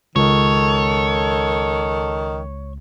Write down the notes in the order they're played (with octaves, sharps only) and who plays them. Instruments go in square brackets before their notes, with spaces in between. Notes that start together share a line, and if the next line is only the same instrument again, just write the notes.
[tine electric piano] C#2 [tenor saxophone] D#3 [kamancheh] A4 [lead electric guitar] C#5